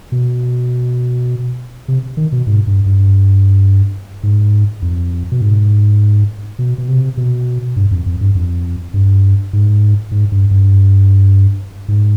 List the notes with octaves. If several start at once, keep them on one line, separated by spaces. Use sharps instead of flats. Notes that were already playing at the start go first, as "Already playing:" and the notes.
B2
C3
D#3
B2
G#2
G2
G2
G#2
F2
B2
G#2
B2
B2
C3
B2
G2
F2
F2
G2
F2
G2
G#2
G#2
G2
G2
G#2